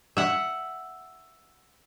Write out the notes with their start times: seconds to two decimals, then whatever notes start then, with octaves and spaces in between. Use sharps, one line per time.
0.17 E5 F#5